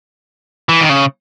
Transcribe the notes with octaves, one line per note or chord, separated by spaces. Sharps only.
E3
D#3
C#3